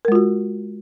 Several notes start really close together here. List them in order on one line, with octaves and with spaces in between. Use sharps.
A#4 G#3 F4 F#4